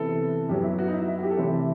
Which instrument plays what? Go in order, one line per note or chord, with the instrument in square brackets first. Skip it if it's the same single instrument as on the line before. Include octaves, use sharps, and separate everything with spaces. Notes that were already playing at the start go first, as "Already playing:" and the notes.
Already playing: [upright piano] C3 E3 B3 A4
F#2 F#3 B3 G4
E4
F#4
D#4
E4
E4
F#4
G4
A4
C3 E3 A3 C4 G4